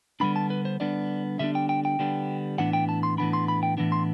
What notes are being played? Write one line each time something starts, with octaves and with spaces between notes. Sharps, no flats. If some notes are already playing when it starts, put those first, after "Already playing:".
D3 G3 B3 D4 B5
A5
B4
C5
D3 G3 B3 D4 D5
D3 G3 B3 D4 E5
G5
G5
G5
D3 G3 B3 D4
A2 E3 B3 D4 F#5
G5
A5
C6
A2 E3 B3 D4 B5
C6
B5
G5
A2 E3 B3 D4
C6